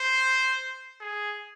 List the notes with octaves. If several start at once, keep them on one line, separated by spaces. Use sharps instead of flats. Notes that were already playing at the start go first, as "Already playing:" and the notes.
Already playing: C5
G#4